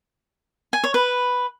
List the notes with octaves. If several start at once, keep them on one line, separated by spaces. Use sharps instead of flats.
G#5
C#5
B4